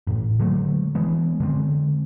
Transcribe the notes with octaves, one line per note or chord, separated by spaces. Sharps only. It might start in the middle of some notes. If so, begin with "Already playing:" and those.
A1 A2
D3 F#3 G#3 A3
E3 G#3 B3
D3 G#3 A3 C4